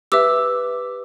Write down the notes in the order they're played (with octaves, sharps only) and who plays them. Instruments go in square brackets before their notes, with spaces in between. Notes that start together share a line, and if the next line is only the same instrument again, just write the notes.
[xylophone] G4 B4 E5 D6 E6